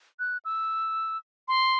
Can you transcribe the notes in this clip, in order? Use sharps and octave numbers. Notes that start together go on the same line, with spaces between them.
F#6
E6
C6